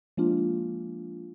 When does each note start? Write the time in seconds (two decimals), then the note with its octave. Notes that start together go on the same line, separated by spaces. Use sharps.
0.17 F3 G#3 A#3 D4 F4